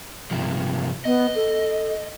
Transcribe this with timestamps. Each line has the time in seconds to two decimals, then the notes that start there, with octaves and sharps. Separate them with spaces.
0.31 G2 C3 F3
1.05 B3 D#5
1.36 A4